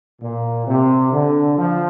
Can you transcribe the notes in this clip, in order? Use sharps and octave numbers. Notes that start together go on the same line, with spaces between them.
A#2
C3
D3
F3